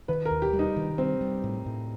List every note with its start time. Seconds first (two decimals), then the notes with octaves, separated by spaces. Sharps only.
0.08 D#3 B4
0.25 A#4
0.31 D#2
0.42 G4
0.53 G3
0.59 D#4
0.77 D#3
0.98 G3 C4
1.21 G3
1.44 A2
1.66 A2